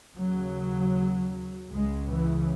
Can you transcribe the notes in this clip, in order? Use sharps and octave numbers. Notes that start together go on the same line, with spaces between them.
D#2 C#3 F#3
C#2 C#3 G#3
E3